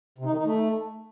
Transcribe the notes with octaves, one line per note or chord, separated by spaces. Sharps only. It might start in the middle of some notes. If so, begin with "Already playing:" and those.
C3
D#4
D#3
D#4
A3